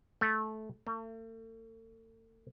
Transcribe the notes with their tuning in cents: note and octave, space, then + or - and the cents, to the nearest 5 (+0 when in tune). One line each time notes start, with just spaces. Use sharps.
A3 -15
A3 +40